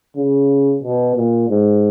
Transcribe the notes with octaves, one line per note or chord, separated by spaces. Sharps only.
C#3
B2
A#2
G#2